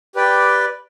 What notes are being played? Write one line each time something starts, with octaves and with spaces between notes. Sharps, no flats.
G4 B4 D5 G5